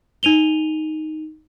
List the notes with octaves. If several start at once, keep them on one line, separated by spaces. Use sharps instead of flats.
D#4 D#7 F7 G7